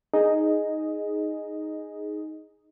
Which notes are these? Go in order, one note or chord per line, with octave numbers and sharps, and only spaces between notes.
D#4 G#4 D#5